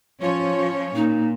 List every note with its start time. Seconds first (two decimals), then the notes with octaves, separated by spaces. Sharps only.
0.21 F3 C#4 F4 C#5
0.95 A#2 D#4